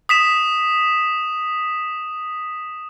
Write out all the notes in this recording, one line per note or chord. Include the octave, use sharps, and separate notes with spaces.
D#6 B6 E7